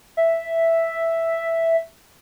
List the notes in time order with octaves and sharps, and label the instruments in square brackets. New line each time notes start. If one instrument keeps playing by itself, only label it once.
[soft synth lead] E5